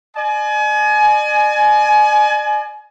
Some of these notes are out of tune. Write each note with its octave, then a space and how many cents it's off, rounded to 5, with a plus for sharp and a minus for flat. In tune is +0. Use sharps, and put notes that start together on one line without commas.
D5 +45 G#5 +30